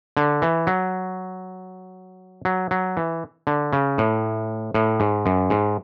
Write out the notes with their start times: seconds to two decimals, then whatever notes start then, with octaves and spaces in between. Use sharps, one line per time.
0.17 D3
0.42 E3
0.67 F#3
2.45 F#3
2.71 F#3
2.97 E3
3.47 D3
3.73 C#3
3.98 A2
4.74 A2
5.00 G#2
5.26 F#2
5.50 G#2